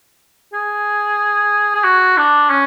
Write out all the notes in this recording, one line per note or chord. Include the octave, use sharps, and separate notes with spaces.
G#4
G#4
F#4
D4
C#4